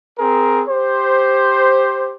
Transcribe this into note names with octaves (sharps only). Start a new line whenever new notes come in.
C4 G#4 A#4
G4 C5